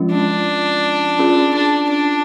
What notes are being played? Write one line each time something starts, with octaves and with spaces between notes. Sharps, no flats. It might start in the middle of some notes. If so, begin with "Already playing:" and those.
Already playing: F3 G#3 C#4 F4
D4
C#4 F4 G#4
D4
D4